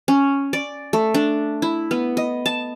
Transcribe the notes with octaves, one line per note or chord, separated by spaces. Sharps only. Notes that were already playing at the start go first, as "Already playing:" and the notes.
C#4
D5
A3
D4
E4
B3
D#5
A5